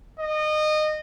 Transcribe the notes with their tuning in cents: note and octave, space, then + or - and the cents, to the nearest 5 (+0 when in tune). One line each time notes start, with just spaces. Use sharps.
D#5 -25